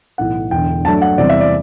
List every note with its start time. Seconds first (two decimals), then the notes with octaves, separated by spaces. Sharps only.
0.18 B1 A2 E3 F#5
0.51 E1 E2 D3 G5
0.85 G2 F#3 A3 D4 A5
1.02 F#5
1.18 E2 C3 E3 G3 C4 D5
1.29 E5
1.41 D5